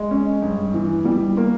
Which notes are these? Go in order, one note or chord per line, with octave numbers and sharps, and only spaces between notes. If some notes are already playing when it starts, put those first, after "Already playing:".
Already playing: G#3 G#4
C#4
G2
E3
G3
A#3